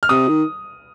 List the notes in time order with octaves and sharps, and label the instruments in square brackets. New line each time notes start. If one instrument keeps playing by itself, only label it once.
[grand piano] F6
[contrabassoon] C3 [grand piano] D#6
[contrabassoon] D#3